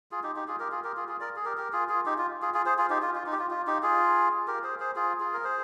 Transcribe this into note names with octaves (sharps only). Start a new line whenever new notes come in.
F4 G#4
D#4 G4
D#4 G4
F4 G#4
G4 A#4
F4 G#4
G4 A#4
F4 G#4
F4 G#4
A#4 D5
G#4
G4 A#4
G4 A#4
F4 G#4
F4 G#4
D#4 G4
F4
F4 G#4
F4 G#4
G#4 C5
F4 G#4
D#4 G4
F4
F4
D#4
G4
F4
F4
D#4 G4
F4 G#4
G4 A#4
G#4 C5
G#4 C5
F4 G#4
F4 G#4
A#4
G#4 C5